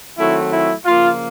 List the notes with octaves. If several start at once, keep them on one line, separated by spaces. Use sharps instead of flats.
D#3 F#3 A3 C4 E4
E4
C#3 F3 A#3 F4